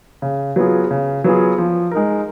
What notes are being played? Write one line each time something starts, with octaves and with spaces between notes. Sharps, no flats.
C#3
F#3 B3 F4 G#4
C#3
F#3 B3 F4 G#4
F3
G#3 D#4 A#4